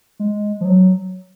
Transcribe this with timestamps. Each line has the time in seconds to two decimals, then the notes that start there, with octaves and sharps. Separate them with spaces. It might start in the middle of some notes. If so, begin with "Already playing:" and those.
0.20 G#3
0.61 F3
0.65 F#3